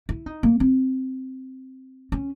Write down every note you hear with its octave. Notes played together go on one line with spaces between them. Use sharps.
E4
D#4
A#3
C4
C#4